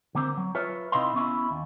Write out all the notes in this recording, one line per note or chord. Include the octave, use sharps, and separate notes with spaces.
D3 A#3 C4
F#3
F4 B4 C#5 E5
C3 D#4 E4 D#5 F5 C6
B3 C#4 E4
D#2